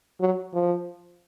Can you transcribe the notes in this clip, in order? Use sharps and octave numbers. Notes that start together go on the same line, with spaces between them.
F#3
F3